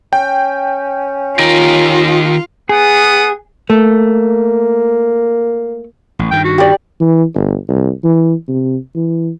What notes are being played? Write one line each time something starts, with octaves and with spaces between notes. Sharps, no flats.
C#4 G5
D#3 F4 G4 A#4
B3 G#4 F#5 D#6
A3 A#3
A1
G2 D#3 G5
F#4
G4 D5
E3
G1
C2
E3
C3
E3